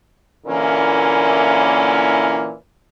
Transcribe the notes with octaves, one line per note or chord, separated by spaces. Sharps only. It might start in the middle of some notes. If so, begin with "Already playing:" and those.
A#2 D3 E3 A#3 C#4 E4